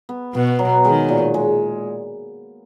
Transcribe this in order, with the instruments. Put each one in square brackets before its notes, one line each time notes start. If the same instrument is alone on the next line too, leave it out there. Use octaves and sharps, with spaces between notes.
[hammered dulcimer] B3
[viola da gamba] B2 [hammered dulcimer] B3
[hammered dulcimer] F#3
[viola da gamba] D#3 [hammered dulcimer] G#3
[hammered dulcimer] A#2
G#3